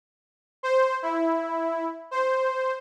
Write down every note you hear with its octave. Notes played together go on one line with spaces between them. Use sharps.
C5
E4
C5